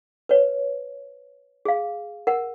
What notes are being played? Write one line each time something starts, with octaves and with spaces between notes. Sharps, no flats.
B4 C#5
G#4 F5
A#4 F#5